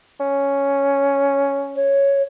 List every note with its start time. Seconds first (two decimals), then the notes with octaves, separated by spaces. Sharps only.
0.20 C#4
1.76 C#5